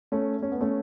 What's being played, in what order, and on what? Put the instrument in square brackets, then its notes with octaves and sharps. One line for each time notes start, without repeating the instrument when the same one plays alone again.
[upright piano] A3 C#4
C#4
B3
A3 C#4